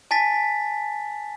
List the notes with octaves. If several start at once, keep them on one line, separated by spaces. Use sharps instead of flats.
G#5 A5 A6 B6